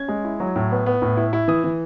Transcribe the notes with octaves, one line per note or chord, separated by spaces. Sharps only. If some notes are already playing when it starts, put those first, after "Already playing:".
Already playing: C#4 G#6
G#3
E4
F#3
A2
B3
B3
A2
E4
E4
E3 D#6
E3